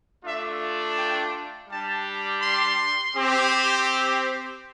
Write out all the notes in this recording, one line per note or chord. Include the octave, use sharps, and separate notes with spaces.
A3 D4 F4 E5
G5
G3 D4 G4 A5
C6
C4 G4